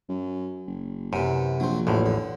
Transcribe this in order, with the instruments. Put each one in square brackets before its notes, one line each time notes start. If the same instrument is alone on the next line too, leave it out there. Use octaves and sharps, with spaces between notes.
[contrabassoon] F#2
F#1
[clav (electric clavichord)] F#2 [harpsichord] C3 E3
[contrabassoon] A#1 [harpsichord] F#3 C4
[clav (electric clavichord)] A1 E2 A2 [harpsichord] F3
[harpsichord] D3